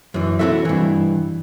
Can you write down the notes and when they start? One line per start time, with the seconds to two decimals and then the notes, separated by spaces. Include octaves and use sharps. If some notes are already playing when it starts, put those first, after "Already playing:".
0.14 F#2 E3
0.39 C4 E4 F#4 A4 E5
0.65 G2 E3